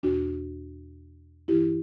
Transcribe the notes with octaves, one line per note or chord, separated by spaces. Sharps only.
E2 B2 D4 F#4
G2 E3 E4 G4